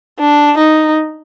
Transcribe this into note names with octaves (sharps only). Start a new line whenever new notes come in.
D4
D#4